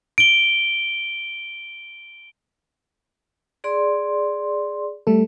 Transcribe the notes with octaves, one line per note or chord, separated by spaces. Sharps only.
D7 G7
G#4 D5 C6
G3 A3 A4